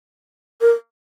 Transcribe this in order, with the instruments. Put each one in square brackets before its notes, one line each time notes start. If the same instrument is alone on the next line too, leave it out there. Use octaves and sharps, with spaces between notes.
[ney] A#4